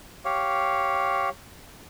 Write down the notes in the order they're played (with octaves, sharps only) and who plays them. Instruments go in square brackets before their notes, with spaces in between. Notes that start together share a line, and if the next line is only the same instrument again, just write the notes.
[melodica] G4 C#5 F5